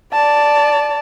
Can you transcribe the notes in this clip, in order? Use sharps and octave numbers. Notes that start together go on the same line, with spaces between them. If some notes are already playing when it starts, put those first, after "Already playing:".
D5 A5